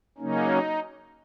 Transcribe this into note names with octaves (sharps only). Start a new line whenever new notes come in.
C#3 F#3 A#3 C#4 D#4